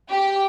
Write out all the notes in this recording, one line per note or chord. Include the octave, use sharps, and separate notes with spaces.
G4